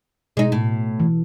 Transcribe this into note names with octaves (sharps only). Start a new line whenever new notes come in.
B2 G#3 D#4
A2
E3